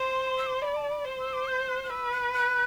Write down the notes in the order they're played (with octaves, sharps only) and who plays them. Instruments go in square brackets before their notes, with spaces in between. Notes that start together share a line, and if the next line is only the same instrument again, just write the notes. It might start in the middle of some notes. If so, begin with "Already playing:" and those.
Already playing: [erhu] C5 [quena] C6
[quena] E6
D6
C6
[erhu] D5 [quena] B5
[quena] A5
B5
[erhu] C5 [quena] C6
[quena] E6
D6
G6
F#6
F#6
[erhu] B4 [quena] E6
[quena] F#6
F#6